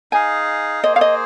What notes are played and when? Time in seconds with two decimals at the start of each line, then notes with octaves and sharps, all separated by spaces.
0.12 D#4 G#4 F5 G#5
0.84 A#3 G#4 C5 D#5
0.96 F5
1.01 D#5